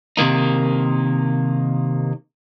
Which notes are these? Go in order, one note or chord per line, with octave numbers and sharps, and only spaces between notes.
C3 D#3 A#3 D#4